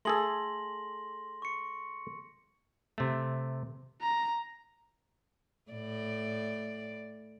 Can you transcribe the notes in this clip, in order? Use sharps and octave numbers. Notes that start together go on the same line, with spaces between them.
A3 G#4 A4 C6 A#6 F#7
C#6 C#7
C3 A3
A#5
A2 D5